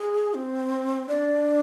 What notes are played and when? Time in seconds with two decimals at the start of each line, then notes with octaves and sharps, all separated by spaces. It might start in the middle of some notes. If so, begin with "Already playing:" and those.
Already playing: G#4
0.34 C4
1.09 D4 D5